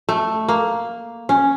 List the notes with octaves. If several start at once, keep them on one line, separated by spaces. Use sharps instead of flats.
A3
A#3
C#4